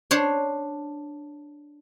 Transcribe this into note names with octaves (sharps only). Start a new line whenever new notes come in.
D4 C5 C#5